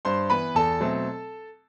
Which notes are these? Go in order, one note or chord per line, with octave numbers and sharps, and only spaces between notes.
G2 C5 C6
E3 B3 B4 B5
E2 A4 A5
B2 F#3 A3 C4